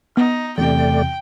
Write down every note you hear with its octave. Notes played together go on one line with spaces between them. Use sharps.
B3 D#4 F6
E2 C3 A3 D5 G5